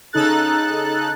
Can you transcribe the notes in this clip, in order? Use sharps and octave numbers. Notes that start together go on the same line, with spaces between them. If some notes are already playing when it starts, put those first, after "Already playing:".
C#3 D#4 A4 F#6 A6